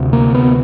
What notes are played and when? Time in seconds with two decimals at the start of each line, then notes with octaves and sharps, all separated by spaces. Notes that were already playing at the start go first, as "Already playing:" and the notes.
Already playing: D2 C3
0.13 A#3
0.35 B3